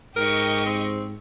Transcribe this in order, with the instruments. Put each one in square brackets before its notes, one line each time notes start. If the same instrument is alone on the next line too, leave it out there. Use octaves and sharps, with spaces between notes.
[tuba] G#2 [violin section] G4 D#5 C#6 [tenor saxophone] A#4
[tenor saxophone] C4